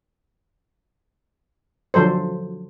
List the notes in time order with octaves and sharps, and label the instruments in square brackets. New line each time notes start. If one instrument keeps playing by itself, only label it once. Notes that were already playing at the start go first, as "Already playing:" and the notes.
[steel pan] D3 F3 F#3 A4 C5